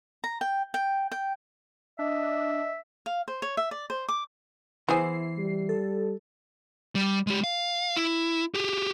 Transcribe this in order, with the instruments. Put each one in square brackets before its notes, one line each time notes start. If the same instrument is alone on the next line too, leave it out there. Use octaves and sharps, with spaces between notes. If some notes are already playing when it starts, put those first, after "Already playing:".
[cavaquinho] A#5
G5
G5
G5
[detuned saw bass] D4 [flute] D#5 [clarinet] E5
[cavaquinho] F5
C5
C#5
E5
D5
C5
D6
[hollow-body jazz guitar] E3 E4 C5 [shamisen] B3 G#4 [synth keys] C7
[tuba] G3
[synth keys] A4
[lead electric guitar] G3
G#3 G4
F5
E4
G4 G#4